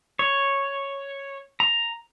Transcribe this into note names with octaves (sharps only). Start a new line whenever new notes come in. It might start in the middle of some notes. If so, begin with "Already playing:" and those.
C#5
A#5